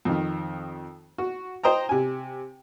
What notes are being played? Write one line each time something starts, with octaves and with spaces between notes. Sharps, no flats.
F2 D#3
F#4
C5 D#5 G5 A#5
C3 G#5